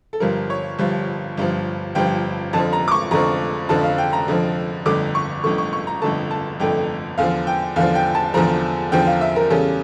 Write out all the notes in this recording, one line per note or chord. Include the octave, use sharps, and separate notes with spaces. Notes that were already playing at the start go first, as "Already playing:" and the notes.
A4
G1 G2 F3 A#4
C#5
G1 G2 F3
G1 G2 F3
G1 G2 F3 G5
F2 D3 F3 A5
A#5
D6
C#6
F2 D3 F3 A#5
F2 D3 F3 A5
F5
G5
A#5
F2 D3 F3
G1 F2 D3 A3 D6
C#6
G1 F2 D3 A3 C#6
C#6
C#6
A#5
G1 F2 D3 A3 A5
A5
G1 F2 D3 A3 G5
E2 D3 F3 F5
G5
E2 D3 F3 F5
G5
A5
E2 D3 F3 A#5
E2 D3 F3 G5
F5
E5
A#4
E2 C#3 G3 C#4 A4